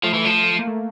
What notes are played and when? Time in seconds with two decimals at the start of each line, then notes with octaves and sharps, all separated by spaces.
0.03 F3 A3
0.14 E3
0.25 F3
0.59 A#3
0.67 A3